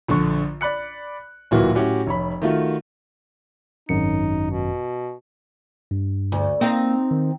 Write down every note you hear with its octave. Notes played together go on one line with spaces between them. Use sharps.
A#1 D3 C#6
D5 B5 F#6 C#7
D1 A#2 E3 F#4
A2 C#4 F#4 G4
F1 C#5 B5
D#3 A3 F4 F#4
G#1 F#2 D#4 C#7
B2
G2
D2
A#3 C4 D#4 F5
D#3